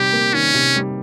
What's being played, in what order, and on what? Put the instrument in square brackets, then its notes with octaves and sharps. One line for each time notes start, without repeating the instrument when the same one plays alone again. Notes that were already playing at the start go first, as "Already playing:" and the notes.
Already playing: [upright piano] C3 D#3 G3 [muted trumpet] G4
[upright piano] A#3
[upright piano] D#3 [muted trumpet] C#4
[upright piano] C3
G3